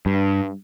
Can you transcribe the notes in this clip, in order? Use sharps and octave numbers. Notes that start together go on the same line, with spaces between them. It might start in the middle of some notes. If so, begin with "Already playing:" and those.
G2